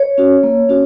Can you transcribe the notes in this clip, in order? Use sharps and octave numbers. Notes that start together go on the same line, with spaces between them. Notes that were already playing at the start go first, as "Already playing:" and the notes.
Already playing: C#5
C#4 F#4
A#3
C#4 F#4